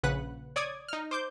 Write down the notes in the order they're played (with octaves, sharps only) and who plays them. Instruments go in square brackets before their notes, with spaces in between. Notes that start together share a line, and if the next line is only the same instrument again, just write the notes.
[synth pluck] A#1 C#3 B4 F#5 F#6
C#5 D5 D6 D#6 G#6
D#4 F6
C5 D6 G6